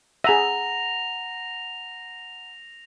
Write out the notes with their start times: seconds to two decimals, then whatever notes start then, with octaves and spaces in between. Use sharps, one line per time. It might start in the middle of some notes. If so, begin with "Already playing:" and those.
0.24 G#4 E5 F#5 A#5 A#6 F7